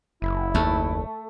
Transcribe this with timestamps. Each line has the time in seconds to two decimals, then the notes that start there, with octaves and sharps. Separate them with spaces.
0.22 F#1 E4
0.55 D#2 A3